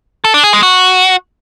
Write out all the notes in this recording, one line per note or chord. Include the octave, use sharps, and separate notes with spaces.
A4
D4
G#4
G#3
F#4